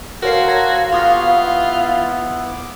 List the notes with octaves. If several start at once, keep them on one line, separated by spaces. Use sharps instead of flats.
F#4 A4 A#4 C5 C#5 F5 C7
A#5 G#6 A#6
B3 F4 G4 C6 C#6 D#6 F6
B3 E4
D6